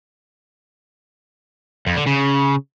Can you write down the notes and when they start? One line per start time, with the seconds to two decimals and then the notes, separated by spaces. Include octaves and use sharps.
1.87 F2
1.97 D3
2.07 C#3